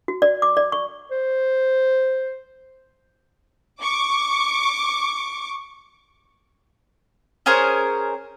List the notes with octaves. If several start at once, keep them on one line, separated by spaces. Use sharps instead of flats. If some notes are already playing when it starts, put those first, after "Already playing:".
F#4
D5
D6
D5
C#6
C5
C#6 D6
C#4 G#4 A#4 C5